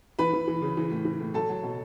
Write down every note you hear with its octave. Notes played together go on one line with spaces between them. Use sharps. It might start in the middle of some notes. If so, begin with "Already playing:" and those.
E3 B4 B5
E3
E3
C#3
E3
A2
E3
A2
F#3 A4 A5
F#3
B2